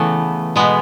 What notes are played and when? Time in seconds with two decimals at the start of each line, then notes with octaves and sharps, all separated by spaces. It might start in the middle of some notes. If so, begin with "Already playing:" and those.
Already playing: C#3 E3 A3 B3
0.56 B2 G#3 B3